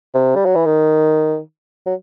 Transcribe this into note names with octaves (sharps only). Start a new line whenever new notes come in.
C3
G3
F#3
E3
D#3
F#3